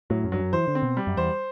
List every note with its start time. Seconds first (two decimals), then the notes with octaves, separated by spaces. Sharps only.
0.10 A2 F#3
0.24 F#2
0.32 G2 F#3
0.39 F#2
0.53 E3 C5
0.68 D3
0.75 C4
0.82 B2
0.97 G3
1.07 F#2
1.17 E2 C5